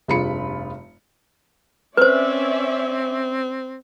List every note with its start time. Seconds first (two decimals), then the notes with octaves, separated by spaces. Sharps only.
0.08 F1 G2 F4 G#4 B5 C#7
1.97 C4 C#4 B4 C5 D5 E5